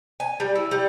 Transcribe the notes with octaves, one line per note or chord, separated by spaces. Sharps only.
G#5
G3
E4
G3